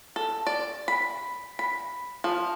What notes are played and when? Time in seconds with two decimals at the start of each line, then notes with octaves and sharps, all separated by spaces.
0.16 A4
0.47 D5
0.88 B5
1.59 B5
2.24 F3